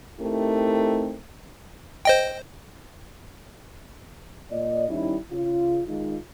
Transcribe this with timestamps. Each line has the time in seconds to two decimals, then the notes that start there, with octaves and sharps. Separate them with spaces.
0.20 A3 C4 D#4 E4 G4 A#4
2.05 C5 D#5 G5
4.51 A#2 D5 D#5
4.89 D#3 G3 C#4 D#4 E4
5.31 C#3 F4
5.86 D#3 G#3 D#4 F4